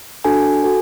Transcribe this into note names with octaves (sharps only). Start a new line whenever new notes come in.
D4 F#4 A4 G#5
F#4 A4